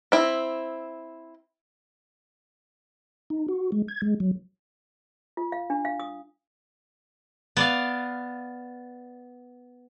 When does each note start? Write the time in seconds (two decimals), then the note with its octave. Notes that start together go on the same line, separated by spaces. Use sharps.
0.12 C4 E4
3.30 D#4
3.48 F#4
3.72 G#3
3.88 G#6
4.02 G#3
4.20 F#3
5.37 F4
5.52 F5
5.70 D4
5.85 F5
6.00 D#6
7.57 B3 D5 F5